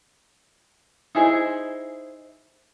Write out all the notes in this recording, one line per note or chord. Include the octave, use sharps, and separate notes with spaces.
D#4 E4 G#4 C5